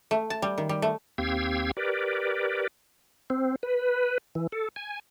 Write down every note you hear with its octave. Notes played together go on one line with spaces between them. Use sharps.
A3
A5
G3
D#3
G3
A3
D#2 C4 G4 F5 E6 G#6
G4 A#4 B4 D5
C4
B4
E3
A4
G#5